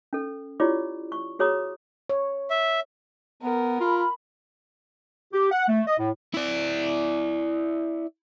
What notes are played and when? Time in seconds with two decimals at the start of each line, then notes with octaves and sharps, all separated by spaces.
0.13 C#4 A4
0.60 E4 F4 G4 C#5 D5 D6
1.12 C#6
1.39 F#4 G#4 C#5 A#5 D#6
2.09 C#5
2.50 E5
3.43 B3 A#4
3.80 F4 B5
5.33 G4
5.51 F#5
5.69 A3
5.87 D#5
5.99 A2
6.34 E4 D5